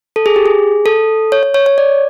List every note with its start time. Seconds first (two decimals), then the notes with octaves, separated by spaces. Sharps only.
0.16 A4
0.26 G#4
0.36 G4
0.46 G#4
0.86 A4
1.32 C#5
1.43 C#5
1.54 C#5
1.66 C#5
1.78 D5